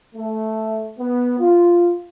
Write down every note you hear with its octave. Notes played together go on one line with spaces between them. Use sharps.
A3
B3
F4